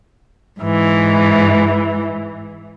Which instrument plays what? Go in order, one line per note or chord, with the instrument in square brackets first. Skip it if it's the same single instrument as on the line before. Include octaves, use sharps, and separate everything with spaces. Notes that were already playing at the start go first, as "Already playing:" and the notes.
[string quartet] G#2 E3